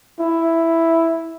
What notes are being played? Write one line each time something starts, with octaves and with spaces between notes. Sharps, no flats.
E4